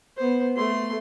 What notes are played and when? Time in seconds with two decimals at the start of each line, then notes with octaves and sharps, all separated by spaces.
0.17 B3 C5
0.56 A3 C6